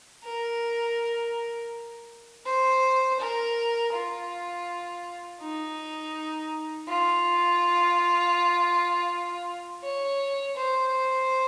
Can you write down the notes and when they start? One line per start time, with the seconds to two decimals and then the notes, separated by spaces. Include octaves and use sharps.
0.25 A#4
2.46 C5
3.20 A#4
3.94 F4
5.41 D#4
6.88 F4
9.84 C#5
10.57 C5